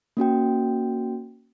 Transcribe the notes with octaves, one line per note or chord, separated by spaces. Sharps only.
A#3 C#4 F#4 G5